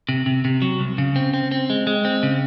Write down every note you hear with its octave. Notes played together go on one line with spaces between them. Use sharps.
C3
C3
C3
F#3
C2
C#3
C4
C4
C4
G#3
G#3
C4
C#3